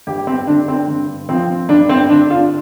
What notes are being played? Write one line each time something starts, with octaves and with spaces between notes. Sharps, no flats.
G2 G4
C4
D3 D4
C4
G2
F3 C4
G2 D4
C4
D3 D4
F4